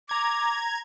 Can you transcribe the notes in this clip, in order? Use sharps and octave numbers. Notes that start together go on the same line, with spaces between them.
A#5 D6 G#6